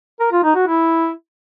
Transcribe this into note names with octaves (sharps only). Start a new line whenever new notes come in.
A#4
F4
D#4
F#4
E4